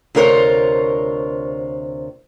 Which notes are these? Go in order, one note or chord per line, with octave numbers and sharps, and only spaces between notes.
D2 C3 F4 A#4 C5 C#5